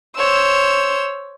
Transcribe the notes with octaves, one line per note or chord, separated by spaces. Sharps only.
C5 C#5 E6